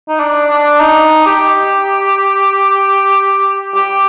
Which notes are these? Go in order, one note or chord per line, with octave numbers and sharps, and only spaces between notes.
D#4
D4
D4
D#4
G4
G4